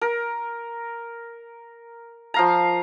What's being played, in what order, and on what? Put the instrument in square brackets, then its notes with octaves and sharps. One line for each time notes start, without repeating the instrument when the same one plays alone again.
[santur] A#4
F3 F5 A#5